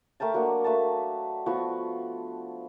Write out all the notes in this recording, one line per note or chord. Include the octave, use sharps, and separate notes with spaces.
A3 A#4 G5 A5
F#3 A#3 D4 F#5
A3 B4 A5
F3 B3 F#4